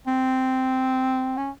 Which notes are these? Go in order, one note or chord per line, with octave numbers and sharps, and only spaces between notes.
C4
C#4